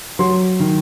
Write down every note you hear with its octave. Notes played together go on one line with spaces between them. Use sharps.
F#3 C6
D#3